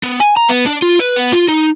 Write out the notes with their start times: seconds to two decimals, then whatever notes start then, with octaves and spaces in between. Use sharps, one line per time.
0.03 B3
0.20 G#5
0.37 A#5
0.49 B3
0.66 D4
0.82 F4
1.00 B4
1.16 B3
1.33 F4
1.49 D#4